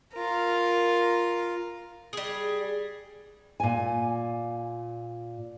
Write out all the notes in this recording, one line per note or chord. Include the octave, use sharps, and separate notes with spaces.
F4 A#4
G3 G#4
A#2 G#5